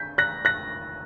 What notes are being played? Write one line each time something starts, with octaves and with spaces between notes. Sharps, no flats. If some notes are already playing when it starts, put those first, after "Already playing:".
Already playing: G6 B6
F#6 A#6
F#6 A#6